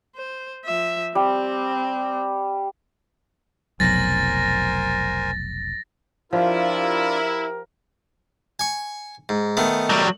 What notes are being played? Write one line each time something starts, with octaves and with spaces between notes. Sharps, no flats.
C5
F3 E5
G3 C4
F1 B1 F#3 A#4 C5 G#5 A6 A#6
F3 D4 E4 F4 G4 A#4
G#5 C#6
G#2
D#3 A3 B3
F#3 G3